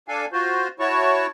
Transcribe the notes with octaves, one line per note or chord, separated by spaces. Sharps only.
D4 A4 F5 G#5
F4 F#4 C5
E4 F#4 C#5 A5 C#6